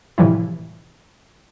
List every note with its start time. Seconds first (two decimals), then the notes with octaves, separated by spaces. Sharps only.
0.18 A2 C3 E3 F3 G3 E4